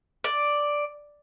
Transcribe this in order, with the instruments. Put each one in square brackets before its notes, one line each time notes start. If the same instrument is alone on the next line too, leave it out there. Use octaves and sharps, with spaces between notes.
[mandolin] D5